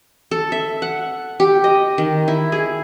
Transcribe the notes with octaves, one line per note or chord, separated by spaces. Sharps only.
A4
E5
F#5
G4
D#5
D#3
E4
G#4